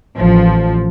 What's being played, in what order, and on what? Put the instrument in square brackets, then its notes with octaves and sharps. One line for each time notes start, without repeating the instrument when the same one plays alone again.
[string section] A1 F3